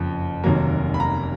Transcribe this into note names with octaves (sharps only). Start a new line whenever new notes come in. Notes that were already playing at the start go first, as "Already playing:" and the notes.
Already playing: F#1 F2 F3
F1 D#2 D#3 F#3 A#3
B5
A#5